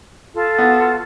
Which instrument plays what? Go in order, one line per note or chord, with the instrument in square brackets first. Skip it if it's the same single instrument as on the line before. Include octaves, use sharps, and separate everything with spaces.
[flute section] F4 A4
[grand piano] B3 F#4